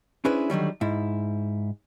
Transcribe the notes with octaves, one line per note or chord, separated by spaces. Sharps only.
C#4 D4 E4 G#4 B4 C5
D3 D#3 F#3 G3
G#2 E4